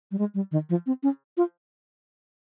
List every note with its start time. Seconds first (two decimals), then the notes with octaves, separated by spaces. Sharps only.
0.11 G3
0.19 G#3
0.35 G3
0.52 D#3
0.69 F3
0.86 C4
1.03 C#4
1.37 F4